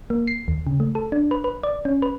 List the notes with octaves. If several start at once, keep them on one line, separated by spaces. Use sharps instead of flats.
A#3
C7
D#2
C#3
A3
A4
D4
B4
B4
D5
C#4
B4